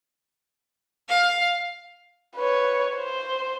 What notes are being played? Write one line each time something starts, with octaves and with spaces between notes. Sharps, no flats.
F5
B4 C#5
C5